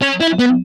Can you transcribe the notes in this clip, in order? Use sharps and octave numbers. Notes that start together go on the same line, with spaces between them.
C#4
E4
B3